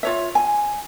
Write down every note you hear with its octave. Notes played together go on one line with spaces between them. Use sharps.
F4 C#5 E5
G#5